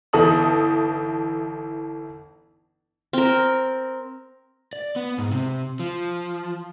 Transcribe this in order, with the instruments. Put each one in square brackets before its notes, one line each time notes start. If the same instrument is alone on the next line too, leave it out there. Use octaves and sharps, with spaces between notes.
[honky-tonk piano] G1 E3 D#4 A4 D#6 F#7
[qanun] C4 A#4
[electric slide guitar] D5
B3
G#2
C3
F3